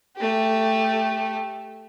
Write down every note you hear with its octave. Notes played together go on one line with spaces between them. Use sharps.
A3 G4